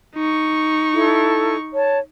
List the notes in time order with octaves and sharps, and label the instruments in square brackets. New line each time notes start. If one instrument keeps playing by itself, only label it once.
[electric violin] D#4 C#6
[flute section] E4 A4
C#5 A5